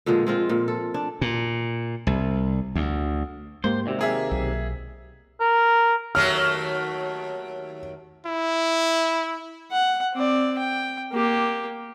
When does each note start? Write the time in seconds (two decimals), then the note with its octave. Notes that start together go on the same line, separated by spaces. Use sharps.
0.06 A#2 D3 F3 G#3
0.27 G#3 C4 F4
0.49 A#2
0.68 A4
0.94 D4
1.21 A#2
2.07 C2
2.76 D2
3.64 G#2 G#3 A#3 G4 C5
3.86 D#2 C3 F#4 D5
3.99 A#3 G#4 E5
4.31 B1
5.40 A#4
6.15 D#2 F#3 A3 F6
8.26 E4
9.72 F#5
10.14 C4 D5
10.58 G5
11.12 A#3 G4